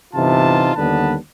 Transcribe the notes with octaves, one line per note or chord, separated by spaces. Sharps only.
G1 C3 E3 D#4 F4 A5
D#2 D3 G3 B3 B4 A5